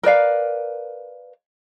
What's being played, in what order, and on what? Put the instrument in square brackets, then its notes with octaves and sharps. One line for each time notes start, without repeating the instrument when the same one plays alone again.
[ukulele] A#4 B4 D5 F5